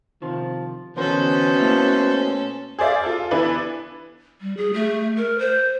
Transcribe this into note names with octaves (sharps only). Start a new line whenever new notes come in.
C3 D#3 F3
E2 B2 D3 C#4 A4 A#4 C5
A3 A#3 E4
G#4 C5 D5 E5 F5
F4 A4
E3 B3 D4 E4 B4
G3
G#4
A3
A#4
C5